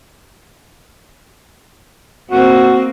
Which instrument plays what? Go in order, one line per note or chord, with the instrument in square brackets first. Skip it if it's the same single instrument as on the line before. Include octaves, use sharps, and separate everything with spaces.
[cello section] A#3 C4 [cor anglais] F#4